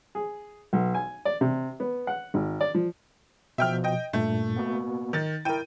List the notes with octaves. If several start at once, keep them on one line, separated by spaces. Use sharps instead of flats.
G#4
B1
G#5
D5
C3
B3
F#5
G#1
D5
F3
B2 F3 E5 G5 F6
D#5 G5
G2 A#2 A3
A#3 B3 F#4
D#3 A6
E4 A#4 G5 D#7